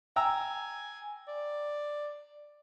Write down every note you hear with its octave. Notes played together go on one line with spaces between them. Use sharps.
G5 G#5 A#5 E6
D5